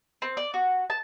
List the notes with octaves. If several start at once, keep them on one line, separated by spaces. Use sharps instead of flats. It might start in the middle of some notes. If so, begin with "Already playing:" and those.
C4
D5
F#4
A5